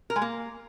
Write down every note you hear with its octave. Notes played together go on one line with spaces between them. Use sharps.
A#4
G#3
A#3